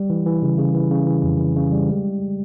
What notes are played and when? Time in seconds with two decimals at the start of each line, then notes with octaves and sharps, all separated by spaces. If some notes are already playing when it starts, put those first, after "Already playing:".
Already playing: G3
0.10 E3
0.26 E3
0.43 C#3
0.58 C#3
0.75 E3
0.91 C#3
1.07 E3
1.23 F2
1.40 E3
1.56 C#3
1.73 G3
1.89 G#3